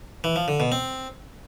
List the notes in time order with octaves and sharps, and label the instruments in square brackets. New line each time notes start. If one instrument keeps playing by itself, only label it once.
[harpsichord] E3
F3
D3
B2
C4